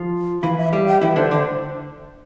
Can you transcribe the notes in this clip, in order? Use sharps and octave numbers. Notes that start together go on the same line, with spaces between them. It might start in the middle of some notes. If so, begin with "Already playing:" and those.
Already playing: F3 F4
E3 E4 F5
E5
G3 G4 F5
G5
E3 E4 E5
D3 D4 C5
D3 D4 C5